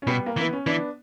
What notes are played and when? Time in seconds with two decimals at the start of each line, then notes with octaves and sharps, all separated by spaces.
0.02 C#4
0.07 B2 G3 B3
0.26 A#3
0.37 E3 B3
0.53 C#4
0.66 E3 B3 D4